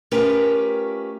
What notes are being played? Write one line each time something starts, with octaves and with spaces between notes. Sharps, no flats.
A3 C#4 F4 G4 A#4 B4